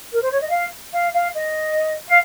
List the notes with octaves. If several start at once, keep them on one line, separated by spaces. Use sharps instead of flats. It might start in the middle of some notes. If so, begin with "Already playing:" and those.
A#4
C5
C#5
D#5
F5
F5
F5
D#5
F5